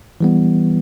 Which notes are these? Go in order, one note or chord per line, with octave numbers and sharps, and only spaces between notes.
E3 G3 B3